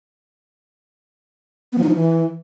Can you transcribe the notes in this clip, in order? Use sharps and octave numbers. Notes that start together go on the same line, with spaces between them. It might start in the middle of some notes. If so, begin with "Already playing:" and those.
B3
F3
D#4
F3
E3